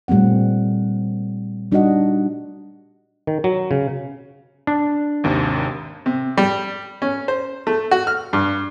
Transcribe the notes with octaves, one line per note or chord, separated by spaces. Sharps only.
A#2 G3 A3 C4 F#5
G3 D4 D#4 F#4 D#5 F#5
D#3
F#3
C#3
D4
G#1 D#2 C3
C3
G3
C#4
C5
A3
F#4
F6
G2